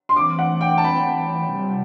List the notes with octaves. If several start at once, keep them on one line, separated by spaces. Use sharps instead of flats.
C6
E3 A3 C4 D6
F#5
G5
A5
B5
C3 G3